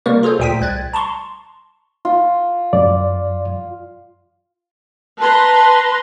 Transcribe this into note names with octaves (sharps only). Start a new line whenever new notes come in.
C3 G3 A#3 A#4 C#6
F4 G#4 A4 C5
D2 A#2 G#4 G5 B6 D#7
C2 F#6 G#6 A6
A5 A#5 C6 C#6
F4
F#2 D5
B4 A5 A#5 C6